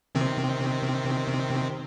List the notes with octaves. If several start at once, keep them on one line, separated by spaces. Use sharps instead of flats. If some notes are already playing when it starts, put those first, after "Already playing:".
C3 D#3 C4